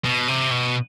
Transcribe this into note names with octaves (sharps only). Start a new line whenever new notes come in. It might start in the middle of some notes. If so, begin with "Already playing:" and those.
B2
C3
B2